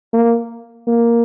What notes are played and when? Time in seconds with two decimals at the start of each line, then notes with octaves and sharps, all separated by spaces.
0.13 A#3
0.87 A#3